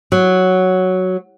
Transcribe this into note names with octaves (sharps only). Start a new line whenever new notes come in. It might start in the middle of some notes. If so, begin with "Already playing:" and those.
F#3